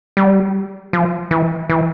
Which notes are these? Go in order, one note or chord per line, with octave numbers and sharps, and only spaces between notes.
G3
F3
E3
E3